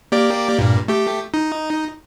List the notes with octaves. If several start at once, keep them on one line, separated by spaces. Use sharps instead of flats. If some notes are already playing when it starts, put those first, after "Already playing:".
A#3 G4 D5
G2 A#2
A3 G4
D#4